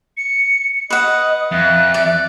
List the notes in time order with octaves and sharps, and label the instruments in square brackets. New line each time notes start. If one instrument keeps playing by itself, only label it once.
[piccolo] C#7
[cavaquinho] B4 F#5 [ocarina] D#5 [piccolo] D#6
[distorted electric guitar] F2 [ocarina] E5 [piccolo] F#6
[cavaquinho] D5